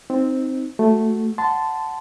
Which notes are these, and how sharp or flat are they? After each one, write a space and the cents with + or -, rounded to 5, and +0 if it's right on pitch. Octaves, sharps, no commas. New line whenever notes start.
C4 +0 D#4 +0
A3 +0 F#4 +0
F#5 +0 A5 -5 C6 -25